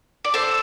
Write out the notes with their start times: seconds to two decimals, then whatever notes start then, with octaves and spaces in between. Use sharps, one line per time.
0.25 D5
0.34 A4 C5